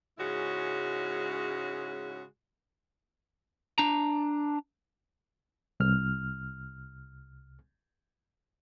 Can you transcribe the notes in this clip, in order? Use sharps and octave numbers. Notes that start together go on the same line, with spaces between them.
G#2 C#3 G#3 C#4 E4 F#4
D4 A#5
C2 F6